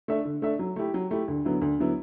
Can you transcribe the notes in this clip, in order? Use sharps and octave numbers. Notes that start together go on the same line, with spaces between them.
A3 D4 A4 E5
D3
A3 D4 A4 E5
F#3
A3 E4 G4
F#3
A3 E4 G4
D2
D3 F#3 B3 E4
D2
D3 F#3 B3 E4